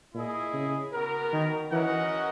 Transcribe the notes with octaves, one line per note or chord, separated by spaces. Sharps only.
A#2 E4 G#4 D#5
C#3
B3 F#4 A#4
D#3
E3 C#4 F#4 A#4 D#5 F#5